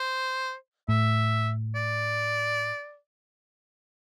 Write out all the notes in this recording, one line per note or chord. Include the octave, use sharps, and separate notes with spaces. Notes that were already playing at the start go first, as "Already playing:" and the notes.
Already playing: C5
A2 E5
D5